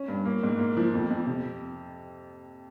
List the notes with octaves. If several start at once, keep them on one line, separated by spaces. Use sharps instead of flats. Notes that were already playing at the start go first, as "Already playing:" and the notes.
Already playing: C#4
G2
A#3
G#2
A#3
F3
F2
F2
C3